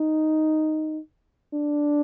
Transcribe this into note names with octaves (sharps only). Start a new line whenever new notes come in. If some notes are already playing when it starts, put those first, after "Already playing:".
Already playing: D#4
D4